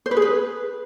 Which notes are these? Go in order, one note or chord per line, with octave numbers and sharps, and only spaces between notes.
C5
B4
G#4
B4